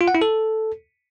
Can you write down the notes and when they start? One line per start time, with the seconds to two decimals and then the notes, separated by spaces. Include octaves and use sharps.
0.01 F4
0.08 F#5
0.15 E4
0.22 A4